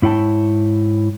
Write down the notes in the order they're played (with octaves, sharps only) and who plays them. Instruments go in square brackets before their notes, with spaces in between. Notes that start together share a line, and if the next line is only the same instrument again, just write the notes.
[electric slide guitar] G#2 E4 C#5 G5 A5